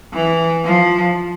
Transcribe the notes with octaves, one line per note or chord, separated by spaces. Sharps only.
E3
F3